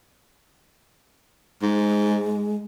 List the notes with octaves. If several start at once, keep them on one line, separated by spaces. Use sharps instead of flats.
G#2 G#3